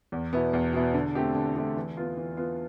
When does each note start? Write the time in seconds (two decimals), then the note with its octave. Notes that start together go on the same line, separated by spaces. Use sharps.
0.12 E2
0.33 B2 B3 E4
0.53 E2
0.73 B2 B3 E4
0.94 D3
1.15 A3 C4 G4
1.35 D3
1.56 A3 C4 G4
1.76 E3
1.97 B3 F4
2.17 E3
2.37 B3 F4